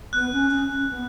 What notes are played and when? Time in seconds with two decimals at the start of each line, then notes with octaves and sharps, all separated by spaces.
0.13 B3 F#6
0.32 C#4
0.51 C#4
0.71 C#4
0.90 B3